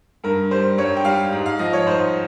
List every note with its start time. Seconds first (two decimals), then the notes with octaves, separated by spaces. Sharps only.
0.24 G2 A#4
0.51 G3 C5
0.78 G2 C#5
0.97 G5
1.05 G3 F5
1.32 G#2
1.46 F5
1.59 F3 D#5
1.73 C#5
1.86 G#2 C5